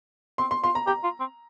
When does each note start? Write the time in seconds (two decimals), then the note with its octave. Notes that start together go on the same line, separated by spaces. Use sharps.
0.38 C4 C6
0.51 C6
0.64 F4 C6
0.75 A#5
0.87 G4 A#5
1.04 F4
1.20 C4